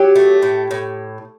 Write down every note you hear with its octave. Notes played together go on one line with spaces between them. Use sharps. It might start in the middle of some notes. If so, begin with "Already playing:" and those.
Already playing: F#3 G4
A3
A2
A2